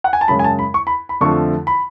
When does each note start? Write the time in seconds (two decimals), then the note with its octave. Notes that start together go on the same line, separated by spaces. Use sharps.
0.04 F#5
0.13 G#5
0.21 A5
0.28 F#2 C#3 G#3 B5
0.39 G#5
0.44 A5
0.59 B5
0.74 C#6
0.87 B5
1.09 B5
1.21 F2 D3 F3 A3 C#6
1.67 B5